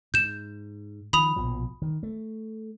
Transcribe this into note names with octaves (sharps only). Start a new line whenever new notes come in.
G#2 G6 E7
D#3 F3 B5 D#6 F7
A#1 B2 F3
D#3
A3